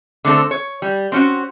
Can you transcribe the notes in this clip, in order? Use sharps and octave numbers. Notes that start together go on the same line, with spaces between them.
D3 A3 C4 A4
C#5
G3
C4 C#4 F#4